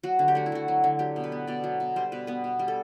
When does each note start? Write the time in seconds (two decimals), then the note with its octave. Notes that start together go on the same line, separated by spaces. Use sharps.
0.03 F#3 F#4
0.19 D3
0.28 G4
0.35 A3 F#4
0.46 E4
0.52 D3 F#4
0.68 F#3
0.84 D3
0.99 F#3 G4
1.16 B2
1.24 B4
1.32 B3
1.47 B2 D5
1.64 F#3
1.80 B2
1.96 G3 C5
2.12 B2 B4
2.27 B3 B4
2.44 B2
2.59 G3
2.68 A4